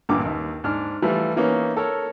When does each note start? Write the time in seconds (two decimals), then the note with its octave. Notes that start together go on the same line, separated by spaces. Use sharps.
0.09 A1 G2 A#2 D3 D6
0.25 D#2
0.64 G#2 D4 F6
1.02 E3 F3 G3 A3
1.37 E3 A#3 B3 C#4 D#4
1.77 A4 A#4 C#5